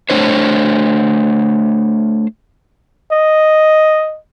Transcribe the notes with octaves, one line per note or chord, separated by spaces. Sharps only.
A3 D4 C5 C#5
D#5